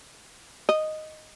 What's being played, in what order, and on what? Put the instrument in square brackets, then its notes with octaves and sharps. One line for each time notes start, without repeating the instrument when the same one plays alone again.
[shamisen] D#5